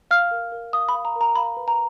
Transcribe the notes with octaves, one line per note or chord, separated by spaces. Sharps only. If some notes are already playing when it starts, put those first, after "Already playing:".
F5 F6
A#4
A#4
F5 D#6
B5
F5
A#5
A#4
A#5
F5 B5
B4
A#5